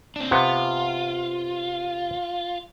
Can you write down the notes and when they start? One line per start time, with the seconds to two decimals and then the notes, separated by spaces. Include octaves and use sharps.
0.16 C4 D4
0.31 C3 B3 F4 F#5